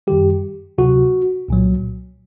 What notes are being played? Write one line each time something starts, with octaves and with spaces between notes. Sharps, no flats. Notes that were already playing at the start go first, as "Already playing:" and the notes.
F#2 D#3 G3 G4
D2 C3 F#3 F#4
C2 A#2 F#3